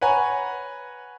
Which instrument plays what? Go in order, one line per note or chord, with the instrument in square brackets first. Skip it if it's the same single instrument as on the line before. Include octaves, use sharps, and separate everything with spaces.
[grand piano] B4 C#5 F#5 G#5 A#5